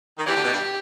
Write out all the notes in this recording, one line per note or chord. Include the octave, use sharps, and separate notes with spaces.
D#3
E2 E3 G4
D2 D3
B2
G2